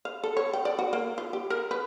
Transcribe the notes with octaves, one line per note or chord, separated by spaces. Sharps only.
F5
A4
C#5
G5
D5
F#4
A#3
F4
G4
A#4
B4